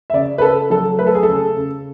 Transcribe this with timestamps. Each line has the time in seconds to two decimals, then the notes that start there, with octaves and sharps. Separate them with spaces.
0.10 E5
0.13 C#3 D5
0.38 B4
0.42 C#3 A4
0.70 F#3 A4
0.99 A3 B4
1.07 A4
1.15 G#4
1.23 C#3 A4
1.57 C#3